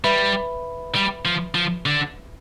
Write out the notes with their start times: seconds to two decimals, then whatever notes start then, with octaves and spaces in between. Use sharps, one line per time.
0.04 G3 B4 E5 B5
0.95 G3
1.25 F3
1.55 F3
1.86 D3